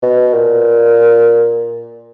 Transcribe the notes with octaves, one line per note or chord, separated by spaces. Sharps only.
B2
A#2